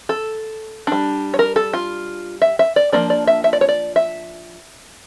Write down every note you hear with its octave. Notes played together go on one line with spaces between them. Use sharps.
A4
G3 D4
C#5
A#4
A4
F4
E5
E5
D5
F3 A#3 D4 D5
D5
E5
E5
D5
C#5
D5
E5